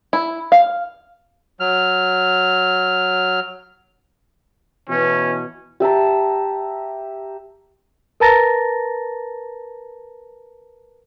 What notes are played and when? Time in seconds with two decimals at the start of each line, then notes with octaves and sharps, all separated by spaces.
0.13 E4
0.52 F5
1.60 F#3 F6
4.90 B2 E3 C#4
5.80 G4 E5 A5 A#5
8.20 A#4 B4 A5 A#5 A6 A#6